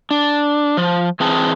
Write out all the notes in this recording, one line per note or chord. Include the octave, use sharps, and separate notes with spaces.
D4
F3
E3 C4 G#4 A5